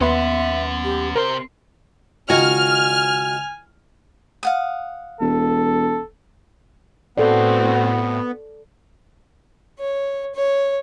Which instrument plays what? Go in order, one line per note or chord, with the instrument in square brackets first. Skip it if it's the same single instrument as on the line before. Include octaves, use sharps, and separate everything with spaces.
[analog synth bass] D#2 [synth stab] B3 C6 [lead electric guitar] C#4 F#5 [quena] E5
[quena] G4
[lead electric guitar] C3 C6 [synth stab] A#4 [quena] C5
[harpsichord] C#2 D#3 [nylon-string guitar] F#4 [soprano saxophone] G#5 [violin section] F6
[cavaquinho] F5 F#5 D#6
[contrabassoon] E1 [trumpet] A4
[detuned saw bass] A2 [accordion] B3 [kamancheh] C4 F#4 [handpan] A4 D5
[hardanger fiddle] C#5
C#5